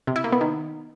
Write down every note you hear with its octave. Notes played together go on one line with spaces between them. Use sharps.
C3
E4
A#3
B3
D#3